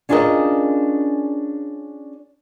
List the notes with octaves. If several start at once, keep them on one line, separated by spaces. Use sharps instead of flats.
C#4 D4 F4 G#4 A#4 D#5